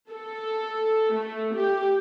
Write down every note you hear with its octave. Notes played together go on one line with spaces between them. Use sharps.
A4
A3
G4